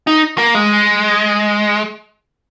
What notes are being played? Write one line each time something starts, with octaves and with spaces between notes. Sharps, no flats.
D#4
A#3
G#3